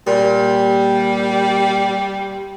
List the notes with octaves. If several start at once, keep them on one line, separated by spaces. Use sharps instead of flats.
A#2 G3